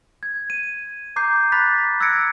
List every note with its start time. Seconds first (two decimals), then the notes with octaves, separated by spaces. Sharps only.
0.23 G#6
0.50 D#7
1.16 A#5 D6 G6 C7
1.52 B5 D6 F#6 A6 B6
2.00 E6 F#6 G#6 A#6 C#7 D7